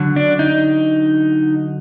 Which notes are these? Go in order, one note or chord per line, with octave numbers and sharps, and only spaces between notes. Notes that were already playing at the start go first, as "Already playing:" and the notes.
Already playing: D3 F#3
D4
D#4